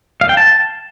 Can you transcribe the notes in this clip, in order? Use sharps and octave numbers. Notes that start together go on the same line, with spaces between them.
F5
G5
A5